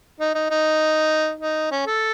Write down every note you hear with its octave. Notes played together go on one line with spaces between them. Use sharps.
D#4
D#4
D#4
D#4
C#4
A4